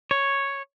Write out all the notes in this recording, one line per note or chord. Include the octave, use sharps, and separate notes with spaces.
C#5